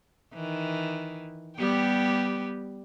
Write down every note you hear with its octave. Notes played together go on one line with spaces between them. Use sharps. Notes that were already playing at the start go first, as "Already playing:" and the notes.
D#3 E3
G3 B3 G4